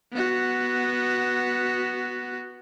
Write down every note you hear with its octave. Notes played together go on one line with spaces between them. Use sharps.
B3 F#4